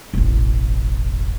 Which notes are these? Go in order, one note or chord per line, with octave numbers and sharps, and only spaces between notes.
E1 A1